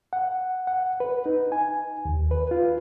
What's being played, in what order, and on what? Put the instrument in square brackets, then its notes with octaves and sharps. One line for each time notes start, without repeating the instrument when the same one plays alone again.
[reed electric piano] F#5
F#5
B4
D#4
G#5
D#2
B4
F4